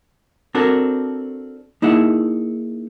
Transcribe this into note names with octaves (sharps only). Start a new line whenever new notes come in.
C4 D4 F#4 A4 A#4
A#3 D#4 E4 G#4 E5 F#5